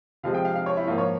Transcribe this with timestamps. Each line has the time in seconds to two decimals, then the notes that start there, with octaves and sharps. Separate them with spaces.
0.23 C3 F3 G#3 F5
0.34 G5
0.45 F5
0.55 F5
0.66 C#5
0.77 E4
0.87 G#2 F3 A#3 F4
0.98 C#5